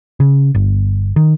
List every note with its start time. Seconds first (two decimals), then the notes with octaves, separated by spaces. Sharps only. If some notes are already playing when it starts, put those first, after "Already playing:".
0.20 C#3
0.55 G1
1.16 D#3